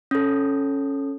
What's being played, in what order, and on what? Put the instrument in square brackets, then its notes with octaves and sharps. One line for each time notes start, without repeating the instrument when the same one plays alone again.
[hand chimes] C#4 A4